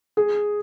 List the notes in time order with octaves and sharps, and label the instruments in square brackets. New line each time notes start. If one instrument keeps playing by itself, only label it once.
[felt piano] G#4